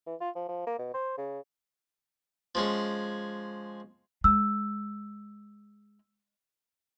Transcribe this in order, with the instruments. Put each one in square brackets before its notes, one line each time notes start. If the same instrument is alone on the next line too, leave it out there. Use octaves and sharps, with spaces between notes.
[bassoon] E3
F4
F3
F3
A#3
B2
C5
C#3
[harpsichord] F3 G#3 C#4
[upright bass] G#3 [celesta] E6